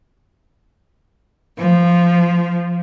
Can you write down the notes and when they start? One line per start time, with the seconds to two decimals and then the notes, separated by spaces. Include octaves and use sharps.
1.58 F3